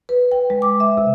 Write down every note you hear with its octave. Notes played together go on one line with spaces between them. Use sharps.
B4
G5
G#3
D6
E5
C3